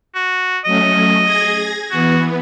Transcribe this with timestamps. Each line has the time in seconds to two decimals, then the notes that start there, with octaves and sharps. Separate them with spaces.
0.15 F#4
0.65 F#3 A3 C#4 D#5
1.24 G#4 G#6 A#6
1.92 E3 B3 F#4